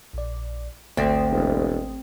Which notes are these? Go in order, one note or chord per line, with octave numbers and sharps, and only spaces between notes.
A#1 D5
G#1 D2 A3 C4 D#6
E1